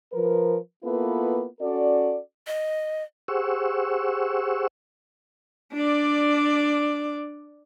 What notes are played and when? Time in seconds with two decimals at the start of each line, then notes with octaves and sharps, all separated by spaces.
0.13 F3 A#4 B4
0.84 A#3 B3 E4 F4 A4 B4
1.61 C#4 F#4 A4 D5
2.47 D#5
3.28 G4 G#4 C5 F#5 C#6 E6
5.74 D4 D5